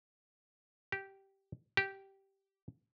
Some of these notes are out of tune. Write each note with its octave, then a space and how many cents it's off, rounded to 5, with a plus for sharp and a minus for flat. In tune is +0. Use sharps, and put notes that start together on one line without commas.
G4 -10
G4 -10